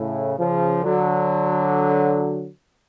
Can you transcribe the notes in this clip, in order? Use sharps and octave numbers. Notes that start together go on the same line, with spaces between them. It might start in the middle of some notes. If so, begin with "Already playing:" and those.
Already playing: A2 C#3
C#3 F3
D3 F#3